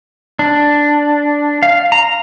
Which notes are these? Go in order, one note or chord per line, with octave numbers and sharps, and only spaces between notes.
D4
F5
A#5